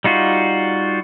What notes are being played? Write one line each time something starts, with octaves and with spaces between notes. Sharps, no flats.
G3 D#4 F4 F#4